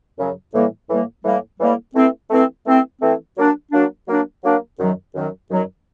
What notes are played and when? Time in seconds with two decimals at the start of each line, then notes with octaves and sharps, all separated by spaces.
0.18 F#2 C#3 F#3
0.53 A2 E3 G3 A#3
0.90 A2 E3 G3 A#3
1.25 A2 E3 G3 A#3
1.60 A2 E3 G3 A#3
1.95 E3 A3 C4
2.30 E3 A3 C4
2.66 E3 A3 C4
3.02 E3 A3 C4
3.37 F#3 A#3 D4
3.72 F#3 A#3 D4
4.08 F#3 A#3 D4
4.44 F#3 A#3 D4
4.78 F#2 D#3 F#3
5.15 F#2 D#3 F#3
5.50 F#2 D#3 F#3